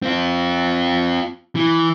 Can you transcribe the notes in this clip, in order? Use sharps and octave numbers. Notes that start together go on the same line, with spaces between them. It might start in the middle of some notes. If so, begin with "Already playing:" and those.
C4 F4
E3